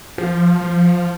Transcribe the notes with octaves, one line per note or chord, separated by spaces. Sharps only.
F3
F3